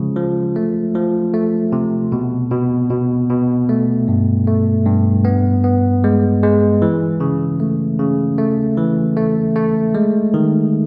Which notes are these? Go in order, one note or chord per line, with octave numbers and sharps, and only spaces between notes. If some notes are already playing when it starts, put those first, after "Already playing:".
Already playing: C#3 F3 G#3
F3
A3
F3
A3
C3
B2
B2
B2
B2
A3
G2
A3
G2
B3
B3
G#3
G#3
E3
C#3
A3
C#3
A3
E3
A3
A3
G#3
D#3